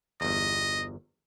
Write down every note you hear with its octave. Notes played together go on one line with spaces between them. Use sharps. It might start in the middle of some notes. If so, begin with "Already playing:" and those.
G1 E2 D#5